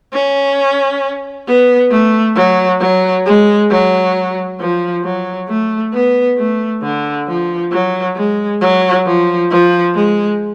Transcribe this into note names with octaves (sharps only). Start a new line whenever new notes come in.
C#4
B3
A3
F#3
F#3
G#3
F#3
F3
F#3
A3
B3
A3
D3
F3
F#3
G#3
F#3
F3
F3
G#3